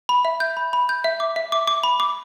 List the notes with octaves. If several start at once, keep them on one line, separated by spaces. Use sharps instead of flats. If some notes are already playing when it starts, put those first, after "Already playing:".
B5
E5
G6
B5
B5
G6
E5
D6
E5
D6
D6
B5
D6